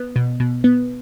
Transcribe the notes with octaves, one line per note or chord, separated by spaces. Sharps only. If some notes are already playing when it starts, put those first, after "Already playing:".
Already playing: B3
B2
B2
B3